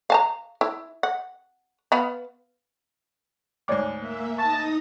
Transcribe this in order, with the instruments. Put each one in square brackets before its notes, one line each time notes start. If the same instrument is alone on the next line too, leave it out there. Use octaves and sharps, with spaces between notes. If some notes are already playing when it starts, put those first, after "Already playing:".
[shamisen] F5 A5 A#5
E4
F#5
B3 F5 B5
[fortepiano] D2 G#2 [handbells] C#5 D5 D6
[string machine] A#3 E5
[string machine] D#4 D#6 A#6 [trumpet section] A5 [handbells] C#6